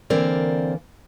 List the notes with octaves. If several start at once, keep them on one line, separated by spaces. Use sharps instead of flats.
D3 E3 A#3 C4 A#4 D5